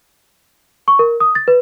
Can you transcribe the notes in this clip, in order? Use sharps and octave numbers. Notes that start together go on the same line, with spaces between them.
C#6
A#4
D#6
A6
B4